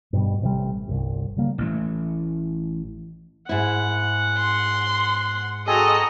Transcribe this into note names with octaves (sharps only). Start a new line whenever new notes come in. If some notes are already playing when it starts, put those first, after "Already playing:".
G2 B2 G3
A1 C3 D#3 G3
G1 C2
C#3 G3 A#3
A1 E3 A3
G#2 E4 F#5
C6
C4 F#4 G#4 A4 D#5 A#5